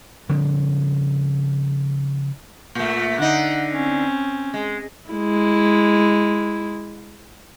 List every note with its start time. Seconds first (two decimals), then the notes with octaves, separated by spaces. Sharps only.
0.29 C#3 F3 G3 C4
2.75 A#2 A3
3.18 D3 D#4 F#5
3.73 C4 C#4
4.54 G#3
5.11 G#3 E4